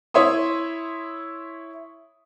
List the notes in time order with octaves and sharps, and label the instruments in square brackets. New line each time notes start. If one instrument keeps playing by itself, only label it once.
[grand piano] E4 C#5 E5 C6 D#6